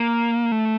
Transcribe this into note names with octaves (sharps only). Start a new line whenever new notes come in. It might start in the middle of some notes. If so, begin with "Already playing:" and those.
Already playing: A#3
A3